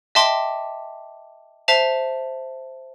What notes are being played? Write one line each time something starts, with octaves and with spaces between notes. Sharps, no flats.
D#5 E5 G5 A5 C6 D6
C5 E5 A5 C7 F7